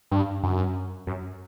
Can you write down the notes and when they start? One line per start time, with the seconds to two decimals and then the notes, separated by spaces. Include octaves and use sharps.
0.11 G2
0.43 F#2
1.07 F#2